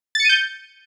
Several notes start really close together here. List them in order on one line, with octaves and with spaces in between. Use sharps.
A6 C#7 D#7 G6